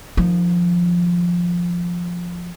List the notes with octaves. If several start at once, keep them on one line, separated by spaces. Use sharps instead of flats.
D#3 F3